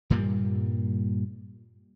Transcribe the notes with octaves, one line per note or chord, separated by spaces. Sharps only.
G2 A#2 G3 A#3